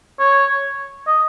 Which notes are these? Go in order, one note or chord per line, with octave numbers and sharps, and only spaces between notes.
C#5
D#5